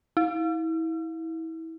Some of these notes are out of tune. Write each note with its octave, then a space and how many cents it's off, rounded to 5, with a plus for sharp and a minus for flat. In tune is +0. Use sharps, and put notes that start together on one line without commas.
E4 -30